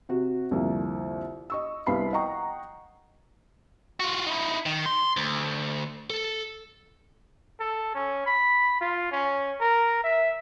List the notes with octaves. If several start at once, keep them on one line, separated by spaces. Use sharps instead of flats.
C3 F#4
C2 F2 D3 A#3
D#5 C#6 E6
C2 B3 F5 B5 C7
D#5 F#5 G5 A#5 C#6
F4 F#4
D#4 E4
D#3
C6
D2
A4
A4
C#4
B5
F4
C#4
A#4
E5